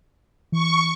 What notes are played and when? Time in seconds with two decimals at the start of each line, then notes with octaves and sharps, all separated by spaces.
0.52 E3 C#6